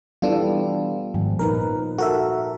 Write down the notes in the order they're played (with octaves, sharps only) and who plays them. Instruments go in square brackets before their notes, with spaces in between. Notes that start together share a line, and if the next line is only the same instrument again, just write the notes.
[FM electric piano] E3 D4 F4 [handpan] G3 B3 A4
[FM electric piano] G#1 [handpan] F3
[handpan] A#2 D#4 B4 [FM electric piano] A#4
[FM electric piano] F#4 A#4 E5 [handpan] A4